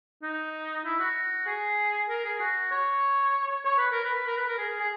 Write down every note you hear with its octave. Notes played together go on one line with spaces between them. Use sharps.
D#4
E4
F#4
G#4
A#4
G#4
F#4
C#5
C#5
B4
A#4
B4
A#4
B4
A#4
G#4
G#4